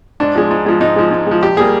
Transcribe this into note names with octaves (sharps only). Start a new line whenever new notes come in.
G#2 D4
F3 G#3
G#2
F3 G#3
G#2 D#4
F3 G#3
G#2
F3 G#3
A#1 G4
G3 A#3 G#4